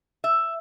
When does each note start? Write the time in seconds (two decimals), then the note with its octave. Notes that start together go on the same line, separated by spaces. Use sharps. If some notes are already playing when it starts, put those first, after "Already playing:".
0.24 E5